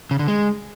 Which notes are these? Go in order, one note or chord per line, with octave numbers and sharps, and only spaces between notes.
C#3
D3
G#3